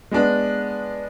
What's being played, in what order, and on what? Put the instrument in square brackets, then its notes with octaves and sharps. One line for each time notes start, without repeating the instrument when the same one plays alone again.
[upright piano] G#3 B3 D4